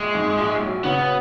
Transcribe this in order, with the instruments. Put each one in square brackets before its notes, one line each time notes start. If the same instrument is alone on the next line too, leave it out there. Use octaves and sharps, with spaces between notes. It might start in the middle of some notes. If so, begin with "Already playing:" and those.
Already playing: [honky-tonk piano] A#1 [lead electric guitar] G#3
[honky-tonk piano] G#2
A#1
F#3
[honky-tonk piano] C#3 [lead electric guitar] B3